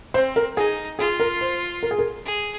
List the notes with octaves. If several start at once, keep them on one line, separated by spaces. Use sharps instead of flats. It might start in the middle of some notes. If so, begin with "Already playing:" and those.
C4 C5
A#4
D#4 G#4
F4 G#4
A#4
C5
A#4
G#4
A#4
G#4